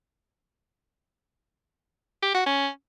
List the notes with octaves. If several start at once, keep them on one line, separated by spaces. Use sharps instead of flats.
G4
F#4
C#4